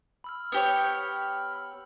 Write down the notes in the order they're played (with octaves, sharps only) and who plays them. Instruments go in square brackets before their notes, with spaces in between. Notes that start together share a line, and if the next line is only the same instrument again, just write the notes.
[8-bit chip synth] B5 E6 F6
[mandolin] B3 G4 C#5